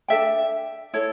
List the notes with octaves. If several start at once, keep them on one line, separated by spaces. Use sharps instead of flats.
D4 A4 E5 G5
E4 A4 C#5